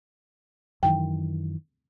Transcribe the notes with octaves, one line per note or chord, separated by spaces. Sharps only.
F#2 D#3 E3 G5